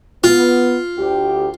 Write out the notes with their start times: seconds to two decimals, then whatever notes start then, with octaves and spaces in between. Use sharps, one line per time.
0.24 B3 F4
0.97 D2 G4